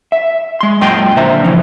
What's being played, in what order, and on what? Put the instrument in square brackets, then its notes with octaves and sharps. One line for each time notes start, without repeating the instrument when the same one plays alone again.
[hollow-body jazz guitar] E5
G#3 C6
F#2 A#2 D#5 G5 C6
A#2 D3 C5 E5 A#5
C#3 E3 F3 C#4